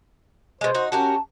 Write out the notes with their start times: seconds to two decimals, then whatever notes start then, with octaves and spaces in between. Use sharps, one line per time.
0.61 B2 G#3 C5
0.75 D#4 F#4
0.92 C#4 F#4 G4 A#4 A5